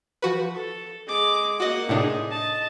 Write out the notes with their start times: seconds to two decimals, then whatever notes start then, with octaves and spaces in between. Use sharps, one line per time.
0.22 F3 F#4 B4
0.54 A4
1.07 G#3 D6
1.60 A#3 F#4 D#5 F#5
1.89 A2 C3 D4 D#4 G#4
2.29 D#5 A5